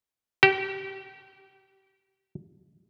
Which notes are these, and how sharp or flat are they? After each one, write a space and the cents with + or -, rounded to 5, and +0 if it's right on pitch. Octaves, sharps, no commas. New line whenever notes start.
G4 -25